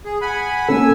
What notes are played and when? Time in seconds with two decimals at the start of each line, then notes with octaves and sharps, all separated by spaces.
0.05 G#4
0.21 F#5 G#5 B5
0.69 A#3 C#4 A4 G#5 E6